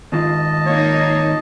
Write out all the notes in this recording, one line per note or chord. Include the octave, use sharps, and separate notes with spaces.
G#2 D#3 F4 D#5 A5
A#3 D#4 C#5